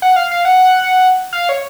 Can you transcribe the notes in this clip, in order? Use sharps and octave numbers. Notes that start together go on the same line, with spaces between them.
F#5
F5
F5
F#5
F5
C#5